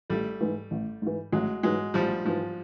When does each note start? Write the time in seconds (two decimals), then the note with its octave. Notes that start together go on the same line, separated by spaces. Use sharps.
0.10 A1 G3 A3
0.41 G#2 E3
0.71 A1
1.02 G#2 E3
1.32 A1 F#3 G#3
1.63 G#2 E3 F#3 G#3
1.94 A1 F3 G3
2.25 G#2 E3 F3